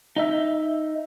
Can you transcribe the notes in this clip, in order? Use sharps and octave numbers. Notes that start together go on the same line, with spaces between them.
D#4 D#5 E5